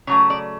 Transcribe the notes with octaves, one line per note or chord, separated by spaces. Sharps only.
C#3 F#3 A3 C#5
D5